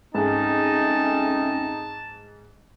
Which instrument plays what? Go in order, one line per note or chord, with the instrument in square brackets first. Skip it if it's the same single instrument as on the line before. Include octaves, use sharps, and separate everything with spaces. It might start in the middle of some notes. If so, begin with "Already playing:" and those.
[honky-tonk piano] G#2 [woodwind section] A3 C4 C#4 [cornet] D#4 [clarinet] A5